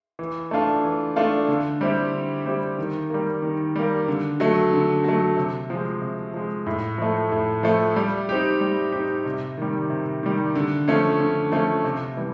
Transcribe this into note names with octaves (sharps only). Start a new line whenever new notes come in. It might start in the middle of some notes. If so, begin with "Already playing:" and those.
E3
A3 D4 F4
E3
A3 D4 F4
D3
G3 C4 E4 G4
D3
G3 C4 E4 G4
D#3
G3 A#3
D#3
G3 A#3
D3
F#3 A3
D3
F#3 A3
C3
F3 G#3
C3
F3 G#3
A2
F3 A3
A2
F3 A3
G3
C4 D#4 G4
G3
C4 D#4 G4
C3
D#3 G3
C3
D#3 G3
D3
F3 A3 C#4
D3
F3 A3 C#4
C3
E3 G3